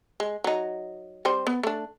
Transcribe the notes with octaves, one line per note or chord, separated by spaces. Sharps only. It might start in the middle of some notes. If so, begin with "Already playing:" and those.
G#3
F#3 D#4
G3 C4 C5
B3
A3 D4